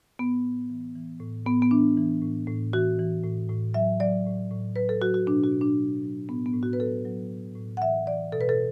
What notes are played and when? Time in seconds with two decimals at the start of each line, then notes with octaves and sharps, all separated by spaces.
0.19 A2 B3
0.44 A2
0.70 E3
0.96 E3
1.20 A2
1.45 A2 B3
1.62 B3
1.71 E3 D4
1.97 E3
2.21 A2
2.48 A2
2.73 E3 F#4
2.99 E3
3.24 A2
3.49 A2
3.74 F#3 E5
4.00 F#3 D5
4.26 A2
4.51 A2
4.76 F#3 B4
4.89 A4
5.02 F#3 F#4
5.14 F#4
5.27 B2 D4
5.44 F#4
5.52 B2
5.61 D4
5.78 F#3
6.03 F#3
6.29 A2 B3
6.46 B3
6.54 A2
6.63 F#4
6.73 B4
6.80 F#3 A4
7.05 F#3
7.30 A2
7.55 A2
7.77 F#5
7.81 E3 E5
8.06 E3 D5
8.32 B2 A4
8.41 B4
8.49 A4